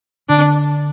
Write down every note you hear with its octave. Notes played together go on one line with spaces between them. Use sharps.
D3 D4